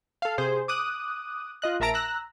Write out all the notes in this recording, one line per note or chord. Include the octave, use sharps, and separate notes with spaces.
A4 F5
C3 G#4 C5
D6 D#6 F#6
F4 D#5 F#6
A#1 A#4 E5 A5 A#5 D7
A#5 E6 F#6 A#6